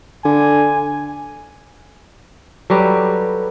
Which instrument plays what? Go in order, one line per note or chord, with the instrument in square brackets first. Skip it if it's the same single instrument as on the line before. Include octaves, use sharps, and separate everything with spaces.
[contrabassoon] D3 [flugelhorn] G#5
[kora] F#3 G3 G4 [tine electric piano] A4 B4